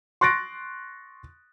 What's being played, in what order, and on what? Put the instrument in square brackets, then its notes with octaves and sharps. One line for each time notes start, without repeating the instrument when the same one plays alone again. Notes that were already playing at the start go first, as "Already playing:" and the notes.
[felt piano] C6 C#6 F#6 A6 A#6 D7